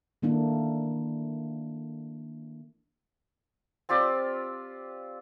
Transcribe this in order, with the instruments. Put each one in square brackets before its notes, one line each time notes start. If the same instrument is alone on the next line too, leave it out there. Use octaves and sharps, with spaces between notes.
[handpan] D#3 A3 A#3 D4 E4
[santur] C4 F4 G4 D5